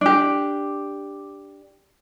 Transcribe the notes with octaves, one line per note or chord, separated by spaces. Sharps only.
D4 G4